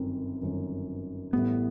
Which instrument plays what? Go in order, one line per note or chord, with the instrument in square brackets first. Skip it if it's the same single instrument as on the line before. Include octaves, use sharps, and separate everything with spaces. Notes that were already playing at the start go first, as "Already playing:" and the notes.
Already playing: [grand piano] G1 F#2 D#3 [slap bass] C4
[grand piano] G1 F#2 D#3
[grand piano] A1 A2 G3 [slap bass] B3